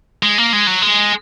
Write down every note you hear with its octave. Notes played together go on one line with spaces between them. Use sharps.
G#3
A#3
G#3
F#3
G#3